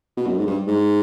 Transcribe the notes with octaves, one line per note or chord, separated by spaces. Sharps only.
B2
F#2
G#2
G2
G#2